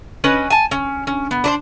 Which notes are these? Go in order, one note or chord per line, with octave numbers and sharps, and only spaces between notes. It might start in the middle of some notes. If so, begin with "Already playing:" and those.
C#4 B4 D#5
G#5 A5
C#4
C#4
B3
D4 B4 C5